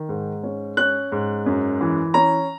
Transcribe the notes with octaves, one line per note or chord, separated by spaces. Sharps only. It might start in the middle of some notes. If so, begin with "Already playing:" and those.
Already playing: D#3
G#2
C#4
C#4 F#6
G#2
F#2
E3
C#4 A#5